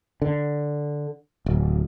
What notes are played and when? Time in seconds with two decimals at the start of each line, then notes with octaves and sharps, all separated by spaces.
0.22 D3
1.46 D1